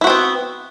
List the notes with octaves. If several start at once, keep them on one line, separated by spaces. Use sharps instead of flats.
B3 C4 E4 F#4